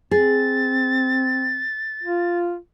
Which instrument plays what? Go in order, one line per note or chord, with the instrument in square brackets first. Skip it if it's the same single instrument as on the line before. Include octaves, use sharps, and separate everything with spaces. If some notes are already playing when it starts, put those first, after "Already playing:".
[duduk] C4 [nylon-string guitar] G#4 [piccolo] A6
[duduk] F4